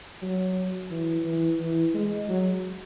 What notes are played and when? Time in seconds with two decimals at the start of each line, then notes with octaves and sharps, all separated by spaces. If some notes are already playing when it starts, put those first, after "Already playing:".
0.22 F#3
0.91 E3
1.25 E3
1.60 E3
1.94 G#3
2.29 F#3